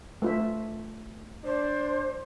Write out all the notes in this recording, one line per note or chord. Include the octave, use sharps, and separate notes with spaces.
A3 F4 E5
D4 C5